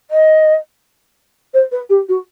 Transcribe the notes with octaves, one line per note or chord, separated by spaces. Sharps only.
D#5
C5
B4
G4
F#4